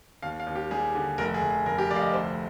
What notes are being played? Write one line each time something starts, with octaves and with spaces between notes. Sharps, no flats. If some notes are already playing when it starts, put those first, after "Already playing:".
D#2 F5
F5
D#2
G4
G3 G#4
D3
F1 A#4
G#4
F1
G#4
F1 A#4
G4
F1 D5
F5
D#5
D2 C5